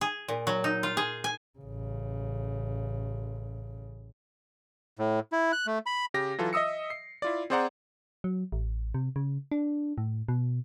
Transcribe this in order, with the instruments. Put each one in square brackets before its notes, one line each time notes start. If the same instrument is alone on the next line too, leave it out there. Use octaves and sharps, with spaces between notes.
[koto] G#4
A#2
F#3
D#4
F4
G#4
G#5
[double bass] A1 C#3
[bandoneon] A2
E4
F#6
A3
B5
[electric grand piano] C#3 G4 A#6
E3 F#3 F4 A4
D#5 E5 D#6 E6 C#7
C7
E4 F4 D5
C4 G#4 C5 D5 F#5 A#5
[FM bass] F#3
A1
C3
C#3
D4
A2
B2